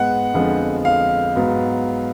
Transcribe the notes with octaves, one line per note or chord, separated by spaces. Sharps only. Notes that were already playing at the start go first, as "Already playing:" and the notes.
Already playing: G#2 G#3 B3 F#5
F2 D3 F3 G#3 B3
F5
G#2 F#3 B3